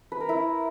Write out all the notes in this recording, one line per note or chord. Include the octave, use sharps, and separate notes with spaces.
B4
A#4
E4